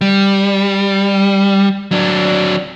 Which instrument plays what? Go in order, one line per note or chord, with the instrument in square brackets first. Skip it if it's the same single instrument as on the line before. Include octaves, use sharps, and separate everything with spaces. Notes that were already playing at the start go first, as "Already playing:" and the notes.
[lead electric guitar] G3
F#3 D4